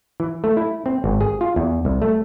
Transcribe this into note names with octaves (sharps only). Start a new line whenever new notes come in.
E3
A3
E4
C4
G#1
G#4
F4
E2
C2
A3